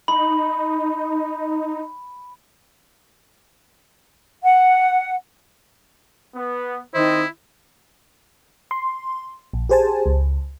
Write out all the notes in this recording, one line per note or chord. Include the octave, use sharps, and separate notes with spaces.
D#4 B5
F#5
B3
D#3 C4 E4 C5 D#5
C6
A#1
G4 G#4 C5 G#5 A5
C#2